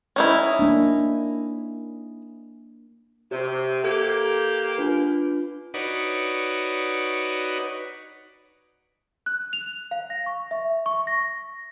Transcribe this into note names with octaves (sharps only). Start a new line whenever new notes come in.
C#4 D#4 E4
A#3 D4
C3 G4 C#5
A#3 G4 A4 G#6
D4 F4 B4
D#4 F#4 B4 C#5 D5
F#6
F7
F5
A#6
C#6
E5
C#6
A#6